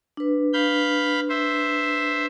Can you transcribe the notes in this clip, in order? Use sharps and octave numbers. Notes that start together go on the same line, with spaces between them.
D4 B4
F5 B5 G6
C5 E5